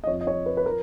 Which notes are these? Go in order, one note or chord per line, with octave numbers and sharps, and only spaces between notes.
D#5
F2 F3 C#5
D#5
C#5
B4
B4
F3 A#4